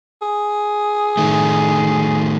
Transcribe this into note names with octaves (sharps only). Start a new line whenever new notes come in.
G#4
A2 D#3 A3